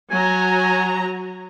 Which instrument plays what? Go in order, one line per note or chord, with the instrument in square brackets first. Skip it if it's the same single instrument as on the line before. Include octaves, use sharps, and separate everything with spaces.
[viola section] F#3 A#5 [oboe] G#5